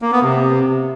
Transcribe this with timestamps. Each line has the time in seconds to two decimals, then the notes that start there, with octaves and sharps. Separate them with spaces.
0.02 A#3
0.12 B3
0.22 C3